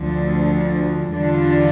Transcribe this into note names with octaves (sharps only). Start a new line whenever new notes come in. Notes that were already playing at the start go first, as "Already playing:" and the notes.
Already playing: D2 D3 F3
E2 D3 G3 D4 F4